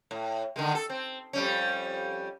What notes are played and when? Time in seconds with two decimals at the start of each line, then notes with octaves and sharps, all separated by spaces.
0.11 A2
0.56 D3 D#3 G#3
0.75 A4
0.90 C4
1.33 F2 G3 C#4